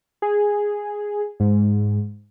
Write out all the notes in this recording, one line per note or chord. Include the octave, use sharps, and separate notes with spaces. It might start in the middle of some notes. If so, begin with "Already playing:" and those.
G#4
G#2